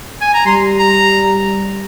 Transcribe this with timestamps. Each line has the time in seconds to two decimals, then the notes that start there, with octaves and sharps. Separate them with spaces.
0.21 G#5
0.34 A#5
0.46 G3 C6
0.78 A#5